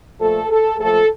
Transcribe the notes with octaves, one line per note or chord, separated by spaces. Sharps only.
A#2 F3 A3 A4
A4
A#2 F3 A3 A4